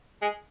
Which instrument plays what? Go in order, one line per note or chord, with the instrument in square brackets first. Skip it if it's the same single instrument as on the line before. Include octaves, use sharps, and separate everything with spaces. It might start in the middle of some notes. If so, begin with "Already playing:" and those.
[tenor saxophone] G#3